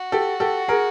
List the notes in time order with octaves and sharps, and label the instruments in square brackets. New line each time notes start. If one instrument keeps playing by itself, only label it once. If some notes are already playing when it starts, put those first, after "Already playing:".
Already playing: [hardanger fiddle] F#4
[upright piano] G4 A4
G4 A4
G#4 A#4